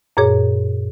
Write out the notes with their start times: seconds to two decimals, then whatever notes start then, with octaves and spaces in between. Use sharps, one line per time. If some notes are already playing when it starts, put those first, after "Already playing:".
0.17 F#2 A#2 G#4 C#5